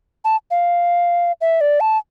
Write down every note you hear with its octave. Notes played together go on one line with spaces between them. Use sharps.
A5
F5
E5
D5
A5